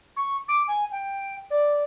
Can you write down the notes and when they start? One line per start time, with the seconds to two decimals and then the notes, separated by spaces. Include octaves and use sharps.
0.16 C#6
0.48 D6
0.67 G#5
0.91 G5
1.50 D5